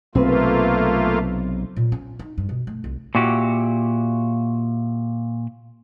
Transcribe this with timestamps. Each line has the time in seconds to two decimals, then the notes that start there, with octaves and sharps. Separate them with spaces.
0.15 B1 C3 A3 A#3 C4 F4 B4
1.76 A#2
1.92 C#4
2.19 D#4
2.38 G2
2.49 B2
2.67 A3
2.84 C2
3.15 A#2 E4 F#4 G4